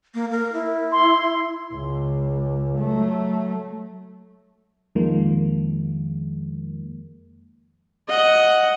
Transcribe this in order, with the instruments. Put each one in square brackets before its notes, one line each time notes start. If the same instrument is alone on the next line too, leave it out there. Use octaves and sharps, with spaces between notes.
[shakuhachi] A#3
A#4
E4
[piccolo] C6
[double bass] C#2
F#3 A3
[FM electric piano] F2 D#3 F3 G#3 A#3
[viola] D#5 F#5